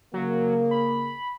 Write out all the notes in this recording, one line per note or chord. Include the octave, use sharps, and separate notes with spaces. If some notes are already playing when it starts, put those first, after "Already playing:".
C#3 F#3 A#3
B5